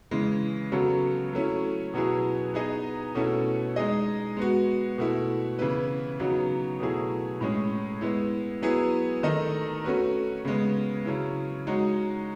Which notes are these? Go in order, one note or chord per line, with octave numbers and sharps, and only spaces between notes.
C#3 E3 G#3
C#3 F#3 B3 F#4 A4
F#3 A3 C#4 E4
B2 F#3 B3 E4 G#4
B3 D#4 G#4 B4 D#5
B2 A3 C#4 E4 A4
G#3 D#4 G#4 D#5
G#3 B3 F#4
B2 A3 E4
C#3 E3 B3 E4 B4
C#3 F#3 B3 D#4 F#4
B2 F#3 A3 E4 G#4
A2 G#3 C#4 G#4
G#3 B3 E4
F#3 B3 E4 G#4
D#3 A3 D#4 A4 D#5
A3 C#4 F#4 B4
C#3 G#3 B3
C#3 F#3 C#4 E4
G#3 D#4 F#4 C#5